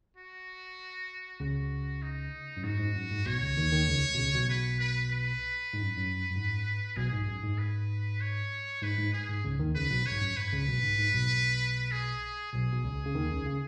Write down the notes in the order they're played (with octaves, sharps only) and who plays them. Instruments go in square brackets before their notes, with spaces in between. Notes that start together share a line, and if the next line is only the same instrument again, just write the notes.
[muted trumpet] F#4
[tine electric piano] C#2 C#3 [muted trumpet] F#4
[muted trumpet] D#4
[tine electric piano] F#2
[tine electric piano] G#2 [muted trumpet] F#4
[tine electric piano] G#2
F#2
G#2
[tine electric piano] B1 B2 [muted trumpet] C#5
[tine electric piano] C#2 C#3
D#2 D#3
D#2 D#3
C#2 C#3
B2
C#2 C#3
B1 B2
[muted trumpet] B4
B4
B4
[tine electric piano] G#2
F#2
F#2
F#2
G#2
[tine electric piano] B1 B2 [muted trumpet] G#4
[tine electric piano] G#2
F#2
G#2
[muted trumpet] B4
C#5
[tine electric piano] G#2 [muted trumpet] B4
[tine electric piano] G#2
[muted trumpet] G#4
[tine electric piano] G#2
C#2 C#3
D#2 D#3
[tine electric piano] C#2 C#3 [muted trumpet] B4
[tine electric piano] B1 B2
[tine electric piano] G#2 [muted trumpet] C#5
[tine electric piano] F#2
[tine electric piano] G#2 [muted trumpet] B4
[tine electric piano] C#2 C#3
B1 B2
G#2
G#2
B1 B2
[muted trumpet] G#4
[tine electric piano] B1 B2 [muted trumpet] G#4
[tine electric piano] B2
C#2 C#3
C#3
D#2 D#3
C#2 C#3
C#3